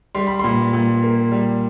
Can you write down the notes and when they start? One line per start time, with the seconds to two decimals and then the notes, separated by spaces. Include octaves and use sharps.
0.15 G3 C6
0.27 B5
0.39 A#2 C6
0.73 A#2
1.03 A#3
1.32 G3